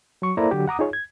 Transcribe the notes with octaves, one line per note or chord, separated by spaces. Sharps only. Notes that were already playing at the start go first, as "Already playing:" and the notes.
F#3 C#6
A#3 E4 A4 C5 D5 A#5
D3 F#3 F#4 G4
F#5 A#5 D6 D#6
D#4 F4 G#4 C#5
G#6